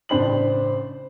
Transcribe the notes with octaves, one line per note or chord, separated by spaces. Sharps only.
A1 C#3 D4 C5 B5 F#7